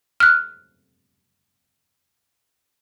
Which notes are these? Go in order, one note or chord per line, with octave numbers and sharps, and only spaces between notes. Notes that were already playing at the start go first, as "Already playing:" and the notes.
F6 F#6